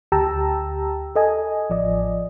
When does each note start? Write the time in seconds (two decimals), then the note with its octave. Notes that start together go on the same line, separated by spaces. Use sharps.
0.12 D2 G4 G5 A5 A#5 E6
1.16 A4 D#5 G#5
1.70 A1 F3 D5 D#5